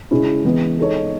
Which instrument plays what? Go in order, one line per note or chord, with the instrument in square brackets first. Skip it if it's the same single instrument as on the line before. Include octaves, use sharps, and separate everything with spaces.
[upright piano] C#3 G#3 C#4 E4
E3 G#3 B3
G#3 D#4 A4 C#5